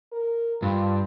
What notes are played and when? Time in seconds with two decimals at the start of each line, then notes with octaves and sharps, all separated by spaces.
0.12 A#4
0.62 G2 F4